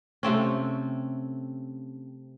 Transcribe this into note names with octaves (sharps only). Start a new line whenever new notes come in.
C3 A3 C4 C#4